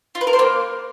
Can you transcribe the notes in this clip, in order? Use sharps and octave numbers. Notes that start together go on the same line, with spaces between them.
F4
B4
A#4
C5
A#3